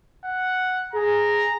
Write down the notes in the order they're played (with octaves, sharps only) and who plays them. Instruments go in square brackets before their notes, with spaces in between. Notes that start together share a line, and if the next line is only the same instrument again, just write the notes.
[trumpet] F#5
[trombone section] G#4 [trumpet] A#5